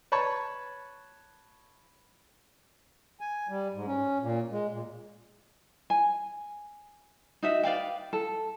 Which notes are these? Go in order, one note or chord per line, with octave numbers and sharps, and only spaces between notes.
B4 C#5 A5 B5 C#6
G#5
G3
G#2
C#4
A#2
G#3
A#2
G#5
D#4 F#4 E5
B4 D5 F5 G5
A4